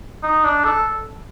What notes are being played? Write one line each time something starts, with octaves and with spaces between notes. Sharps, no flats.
D#4
D4
A4